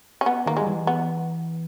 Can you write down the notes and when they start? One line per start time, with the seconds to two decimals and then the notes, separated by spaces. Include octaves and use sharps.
0.21 C#4
0.26 B3
0.46 D#3 A#3
0.57 G#3
0.62 G3
0.67 E3
0.87 B3